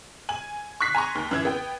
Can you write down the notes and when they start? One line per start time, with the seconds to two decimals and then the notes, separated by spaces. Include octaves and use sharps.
0.29 G#5 F#7
0.80 C#6 F#6 B6 C7
0.95 G#5 A#5 C6 C#6
1.15 D#2
1.31 F#2 E3 G#6
1.45 B3 G5